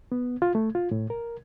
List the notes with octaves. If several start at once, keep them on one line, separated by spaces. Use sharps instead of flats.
B3
F4
A3
F4
A2
A#4